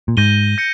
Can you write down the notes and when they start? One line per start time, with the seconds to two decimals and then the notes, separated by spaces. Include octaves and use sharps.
0.08 A#2
0.17 G#2 G6 A#6 D#7 G7
0.58 G6 A#6 C#7